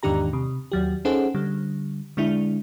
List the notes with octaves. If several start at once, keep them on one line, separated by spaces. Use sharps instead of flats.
E2 G#2 D#3 D4 G4 A#5
C3
D#2 F#3 G4
C#4 D#4 G#4 A4 C5 F#5
D3 G3
D3 G#3 D4 E4